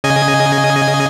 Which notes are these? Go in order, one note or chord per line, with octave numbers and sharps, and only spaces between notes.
C#3 D#5 G#5